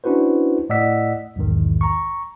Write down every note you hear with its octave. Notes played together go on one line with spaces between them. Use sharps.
C#4 D4 E4 F#4 B4 C5
A2 D5 D#5 F#5 E6 B6
B1 E2 G#2 D#3
A#5 C#6